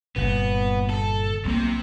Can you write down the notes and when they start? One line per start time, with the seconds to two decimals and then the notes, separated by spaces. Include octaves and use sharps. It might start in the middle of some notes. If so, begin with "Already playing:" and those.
0.16 G1 A#2 B3
0.90 A4
1.45 B1 C3 A#3 C4